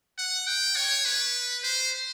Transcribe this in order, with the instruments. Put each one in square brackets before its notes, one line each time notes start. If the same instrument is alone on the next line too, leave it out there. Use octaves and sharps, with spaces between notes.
[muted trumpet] F#5
G5
C#5
B4
C5